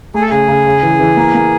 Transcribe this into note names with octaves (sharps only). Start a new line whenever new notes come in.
A3 G#4
A4
C#3 G#4
C#3
C#3
E3
E3
A#3
A#3